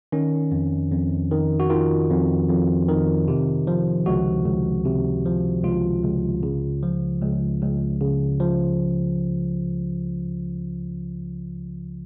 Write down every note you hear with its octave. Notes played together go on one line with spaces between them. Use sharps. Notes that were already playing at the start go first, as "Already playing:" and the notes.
D#3 C#4
F2
F2
D#3
F#4
D#3 F4
F2
F2
D#3
C3
F3
C#2 F#4
C#2
C3
F3
C#2 F4
C#2
C#3
F3
C#2
C#2
C#3
F3